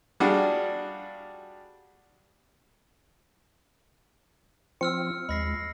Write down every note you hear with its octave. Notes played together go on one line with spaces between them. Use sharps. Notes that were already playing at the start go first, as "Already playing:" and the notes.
G3 D4 F4 F#4 G#4
F3 C4 F4 E6 F6 C#7
D#2 G#3 B5 A#6 C7